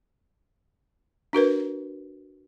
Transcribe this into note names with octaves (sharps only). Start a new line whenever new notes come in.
D4 F#4 A#4 B4